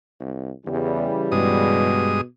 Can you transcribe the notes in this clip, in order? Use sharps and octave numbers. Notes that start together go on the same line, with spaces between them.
C2
E2 C#3 E3 G3
G2 B2 G#3 D#6